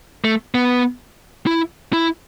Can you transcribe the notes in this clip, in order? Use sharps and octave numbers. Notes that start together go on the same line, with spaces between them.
A3
B3
E4
E4